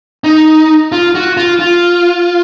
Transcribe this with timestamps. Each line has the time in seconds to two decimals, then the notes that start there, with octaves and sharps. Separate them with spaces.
0.24 D#4
0.92 F4
1.15 F#4
1.37 F4
1.60 F4